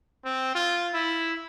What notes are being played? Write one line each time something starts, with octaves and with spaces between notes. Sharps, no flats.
C4
F4
E4